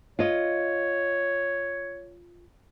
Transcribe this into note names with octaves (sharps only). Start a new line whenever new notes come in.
F4 C#5 D#5